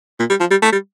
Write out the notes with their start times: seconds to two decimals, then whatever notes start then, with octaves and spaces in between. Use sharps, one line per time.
0.19 A#2
0.30 G3
0.40 F3
0.51 G3
0.62 A3
0.72 G3